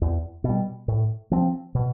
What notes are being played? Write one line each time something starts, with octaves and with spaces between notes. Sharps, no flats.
E2
B2
G3
A2
F3 C4
B2